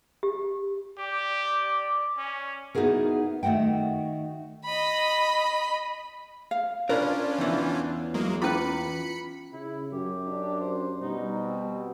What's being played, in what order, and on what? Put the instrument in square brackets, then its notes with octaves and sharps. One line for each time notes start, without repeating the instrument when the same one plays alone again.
[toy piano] G4
[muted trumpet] G4 [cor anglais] D5
[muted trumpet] C#4
[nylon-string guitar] B3 D#4 E4 F#4 G#4 A#4
D#3 A3 F#4 F#5 G5
[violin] D#5 B5
[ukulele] F5
[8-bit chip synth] C#4 D4 F4 [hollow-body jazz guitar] A#4 A#5 B5 [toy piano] C5 D5
[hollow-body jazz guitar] E2 E3
[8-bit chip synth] F#3 G#3 A#3
[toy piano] C#4 E4 D6 [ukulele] F4 B4 [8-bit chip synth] B5 C#7
[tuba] C#3 [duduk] E4
[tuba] F#2 [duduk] G4
[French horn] D4
[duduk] C5
[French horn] B2 [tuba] G3 [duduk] D#4
[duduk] C4